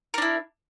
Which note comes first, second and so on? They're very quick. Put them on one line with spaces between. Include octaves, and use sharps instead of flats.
A#4 D4 E4